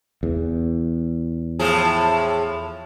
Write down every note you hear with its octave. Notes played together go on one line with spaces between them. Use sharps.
E2
A2 F3 G#4